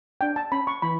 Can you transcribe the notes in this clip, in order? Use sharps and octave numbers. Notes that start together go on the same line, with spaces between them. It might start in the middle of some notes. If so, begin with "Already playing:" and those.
D4 G5
A5
C#4 B5
C#6
E3 B5